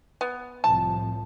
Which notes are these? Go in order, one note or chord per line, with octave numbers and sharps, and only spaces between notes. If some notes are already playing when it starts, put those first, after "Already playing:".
B3
C2 A2 F3 A5